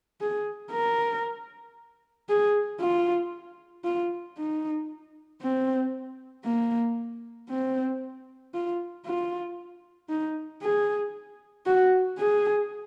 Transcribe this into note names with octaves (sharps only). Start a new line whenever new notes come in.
G#4
A#4
G#4
F4
F4
D#4
C4
A#3
C4
F4
F4
D#4
G#4
F#4
G#4